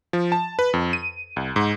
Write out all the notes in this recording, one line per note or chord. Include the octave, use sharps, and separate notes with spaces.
F3
A5
B4
F2
D#7
C2
G#2